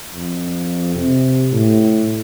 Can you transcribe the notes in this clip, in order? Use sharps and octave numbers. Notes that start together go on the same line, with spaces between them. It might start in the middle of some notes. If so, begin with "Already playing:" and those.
F2
C3
A2